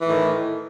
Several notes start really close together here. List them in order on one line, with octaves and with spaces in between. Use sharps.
E3 A2 D#3